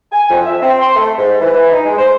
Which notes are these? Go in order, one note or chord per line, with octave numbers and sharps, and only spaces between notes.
G#5
F2
E5
C4
C6
A3
G#2
E3
D#4
G#3
C5